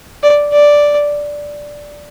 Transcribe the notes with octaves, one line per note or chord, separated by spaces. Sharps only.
D5
D5